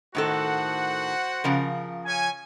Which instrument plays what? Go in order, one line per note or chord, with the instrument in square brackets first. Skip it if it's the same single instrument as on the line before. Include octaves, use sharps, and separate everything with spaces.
[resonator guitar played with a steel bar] A2 D#3 A4 [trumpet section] F#4 C5 F#5
[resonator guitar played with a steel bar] C#3 F3 A#4
[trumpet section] C#4 G#5